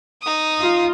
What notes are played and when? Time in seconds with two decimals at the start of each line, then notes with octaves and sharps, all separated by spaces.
0.22 D#4 D#6
0.61 F4